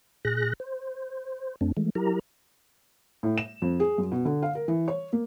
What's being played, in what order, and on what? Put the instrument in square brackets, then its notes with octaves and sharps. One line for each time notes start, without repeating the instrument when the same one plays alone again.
[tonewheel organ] A#2 G#4 F#6 A#6
C5
F2 A3 C4 D4
E3 G#3 A3
F#3 E4 G4 A#4 A#5
[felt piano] A2
E7
F2
G#4
F#2
B2
D3
F5
A#4
E3
C#5
A#3